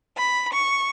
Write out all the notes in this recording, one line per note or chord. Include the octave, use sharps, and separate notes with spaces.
B5
C#6